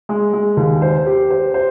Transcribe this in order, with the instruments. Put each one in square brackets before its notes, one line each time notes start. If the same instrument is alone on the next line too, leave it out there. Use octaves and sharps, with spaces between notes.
[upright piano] G#3
G#3
D#2
C5
G4
C5
C5